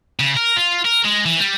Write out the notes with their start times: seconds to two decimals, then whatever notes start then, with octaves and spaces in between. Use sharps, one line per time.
0.20 C#3
0.37 A#4
0.57 F4
0.85 A#4
1.04 G#3
1.25 E3
1.39 G3